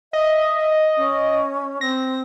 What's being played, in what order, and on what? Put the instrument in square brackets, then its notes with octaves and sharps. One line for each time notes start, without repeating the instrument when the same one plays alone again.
[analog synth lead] D#5 [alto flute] E5
[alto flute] C#4
[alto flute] C4 [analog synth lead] A#6